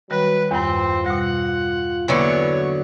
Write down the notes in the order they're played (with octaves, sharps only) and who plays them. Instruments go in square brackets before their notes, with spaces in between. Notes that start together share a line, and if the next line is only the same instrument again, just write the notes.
[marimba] D#3 G3 [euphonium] F#3 [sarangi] B4
[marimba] E2 G2 [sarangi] C4 [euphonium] F4
[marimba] B2 G3 [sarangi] F#5
[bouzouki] D3 F#3 B3 [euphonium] E3 [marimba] A#3 [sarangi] C#5